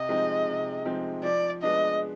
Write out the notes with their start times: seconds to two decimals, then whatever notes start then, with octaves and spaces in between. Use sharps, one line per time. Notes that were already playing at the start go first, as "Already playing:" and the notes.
Already playing: C3 D#5
0.09 F3 G#3 C4 D#4
0.47 C3
0.85 F3 G#3 C4 D#4
1.23 F3 D5
1.63 G#3 B3 D4 D#5